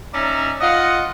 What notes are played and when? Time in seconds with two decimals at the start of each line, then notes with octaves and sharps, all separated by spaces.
0.13 C#4 D#4 D5 E5 A5 A#5
0.60 F4 D#5 F#5